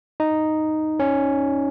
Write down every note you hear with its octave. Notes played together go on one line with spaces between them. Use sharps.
D#4
C#4